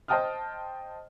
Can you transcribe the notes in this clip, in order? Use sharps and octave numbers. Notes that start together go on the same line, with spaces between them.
C5 D#5 G5 A5 D#6 F6